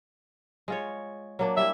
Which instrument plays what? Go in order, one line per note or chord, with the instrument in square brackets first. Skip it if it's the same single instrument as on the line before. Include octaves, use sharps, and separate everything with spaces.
[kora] G#3 F4 C#5
F#3 A#3 D4
[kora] G3 E4 [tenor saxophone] E5